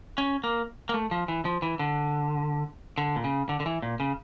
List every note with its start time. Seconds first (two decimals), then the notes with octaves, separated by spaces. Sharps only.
0.18 C#4
0.44 A#3
0.89 A#3
0.94 A3
1.11 F3
1.28 E3
1.45 F3
1.62 E3
1.79 D3
2.98 D3
3.16 A#2
3.24 C#3
3.49 D3
3.60 D3
3.66 E3
3.82 A#2
4.00 C#3